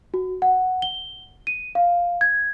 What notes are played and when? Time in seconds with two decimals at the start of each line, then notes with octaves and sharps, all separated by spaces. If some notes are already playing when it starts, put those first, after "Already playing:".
0.14 F#4
0.42 F#5
0.82 G7
1.47 D#7
1.75 F5
2.21 G#6